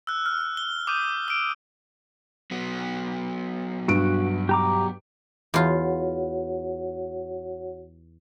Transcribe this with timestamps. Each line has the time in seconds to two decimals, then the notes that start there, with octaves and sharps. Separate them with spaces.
0.07 E6 F#6
0.26 F6
0.57 G7
0.87 D6 D#6 G6 D#7
1.28 E6 D7
2.51 F#3 B3
3.88 G2 F#4 D7
4.49 G4 A#5 D6
5.54 E2 F4 F#4 C#5 F#5